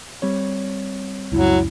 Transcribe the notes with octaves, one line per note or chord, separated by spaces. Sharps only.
G3 C4 C#5
C#2 F#2 F#3 E4